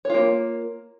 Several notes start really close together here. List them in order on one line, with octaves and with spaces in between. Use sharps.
C#5 F4 A#3